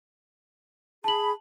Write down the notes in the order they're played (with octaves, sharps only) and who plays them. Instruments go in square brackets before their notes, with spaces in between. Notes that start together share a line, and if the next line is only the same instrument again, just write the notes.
[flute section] G#4 B5 [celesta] A5 F#7